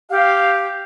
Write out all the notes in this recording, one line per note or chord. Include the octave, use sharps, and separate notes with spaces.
G4 F5